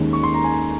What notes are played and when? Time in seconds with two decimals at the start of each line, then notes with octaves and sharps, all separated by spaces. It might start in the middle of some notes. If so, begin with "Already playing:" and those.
Already playing: D#2 D#3 G#3 C#4
0.13 C#6
0.23 C6
0.34 A#5
0.44 G#5